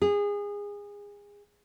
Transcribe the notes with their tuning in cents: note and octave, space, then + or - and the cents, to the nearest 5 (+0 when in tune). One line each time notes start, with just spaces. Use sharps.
G#4 -25